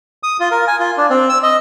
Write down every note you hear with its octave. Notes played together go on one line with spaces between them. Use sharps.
D#6
F4
A#4
G#5
F4
D4
C4
E6
D#5